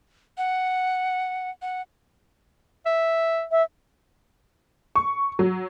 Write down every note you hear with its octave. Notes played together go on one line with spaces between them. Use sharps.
F#5
F#5
E5
E5
C#6
F#3